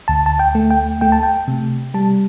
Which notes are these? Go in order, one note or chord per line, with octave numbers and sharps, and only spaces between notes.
D2 A5
A5
G5
A3
G5
A3 G5
A5
G5
C3
G3 A5